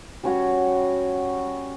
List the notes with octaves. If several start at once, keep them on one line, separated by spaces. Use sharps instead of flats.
G3 C#4 F#4 C#5